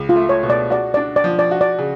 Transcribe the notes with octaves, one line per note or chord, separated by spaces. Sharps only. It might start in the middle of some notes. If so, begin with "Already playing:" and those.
Already playing: C#2
F4
A3
C#5
B2
D5
F#4 D5
D4 D5
D5
F3
D5
F#4
D5
C#3